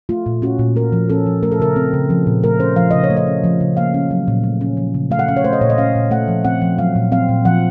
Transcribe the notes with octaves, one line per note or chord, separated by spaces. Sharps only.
A3 F4
A#2
C#4 F#4
A#2
A3 A#4
F3
C#4 A4
F3
A3 A#4
A4
C#3 A#4
C4
C#3
F3
A#2
A3 A#4
C#4 C5
F3 F5
C#3 D#5
C#5
A3
D#5
C#4
F3
C#3
A#3 F5
C#4
F#3
A#2
A3
C#4
F3
C#3
A3 F5
F#5
C#4 F5
C#5
A3 C5
D#5
A#2 C#5
D#5
C#4 F5
A#2
A3 F#5
F3
C4 F#5
F3
F#3 F5
A#2
C4 F5
A#2
F3 F#5